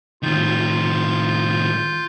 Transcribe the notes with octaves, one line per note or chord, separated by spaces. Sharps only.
A2 D#3 F4 G6